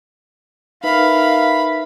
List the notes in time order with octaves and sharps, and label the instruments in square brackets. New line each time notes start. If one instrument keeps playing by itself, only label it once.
[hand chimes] D#4 B4 E5 [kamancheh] A#4 F5 [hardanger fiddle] B5